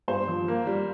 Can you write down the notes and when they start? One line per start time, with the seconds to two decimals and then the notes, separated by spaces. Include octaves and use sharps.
0.08 G2 C5
0.28 F3
0.48 A#3
0.67 G3